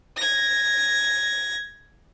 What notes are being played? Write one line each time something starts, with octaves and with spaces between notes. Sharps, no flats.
G#6 A#6